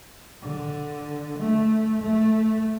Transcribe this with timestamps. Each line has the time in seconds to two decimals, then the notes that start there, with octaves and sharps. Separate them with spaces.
0.42 D3
1.38 A3
2.02 A3